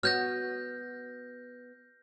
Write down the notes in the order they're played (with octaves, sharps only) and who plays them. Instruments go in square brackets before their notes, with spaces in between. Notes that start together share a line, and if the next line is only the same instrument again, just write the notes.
[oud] B3 F#4 C#5 [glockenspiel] F6 G6 A#6